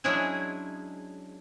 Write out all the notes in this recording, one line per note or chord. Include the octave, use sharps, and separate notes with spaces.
F#3 G#3 C#4 D4 E4 G#4